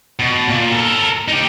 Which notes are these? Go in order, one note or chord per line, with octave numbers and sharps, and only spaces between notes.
B2
A#2
A4 A#4
D#4 G4